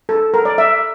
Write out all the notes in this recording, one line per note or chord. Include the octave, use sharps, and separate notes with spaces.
A4
A#4
D5
E5